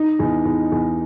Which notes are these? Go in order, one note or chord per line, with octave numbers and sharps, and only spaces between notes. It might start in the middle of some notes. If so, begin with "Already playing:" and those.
Already playing: D#4
E2
E2
E2